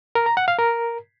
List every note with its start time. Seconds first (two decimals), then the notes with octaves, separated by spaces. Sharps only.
0.15 A#4
0.26 A#5
0.37 F#5
0.48 F5
0.59 A#4